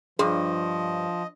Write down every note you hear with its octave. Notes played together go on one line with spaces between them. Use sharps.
G2 F3 G#4 D#5 C6